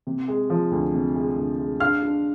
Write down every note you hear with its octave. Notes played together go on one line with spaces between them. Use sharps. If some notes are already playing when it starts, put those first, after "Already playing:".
C3
G#3
F3
D2
C3
G#3
D2
G#3
D4 F5 F6
D4